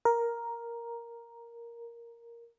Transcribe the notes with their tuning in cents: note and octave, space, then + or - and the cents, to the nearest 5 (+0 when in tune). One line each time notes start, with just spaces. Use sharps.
A#4 +5